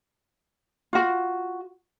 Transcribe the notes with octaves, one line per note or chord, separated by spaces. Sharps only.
F4 F#4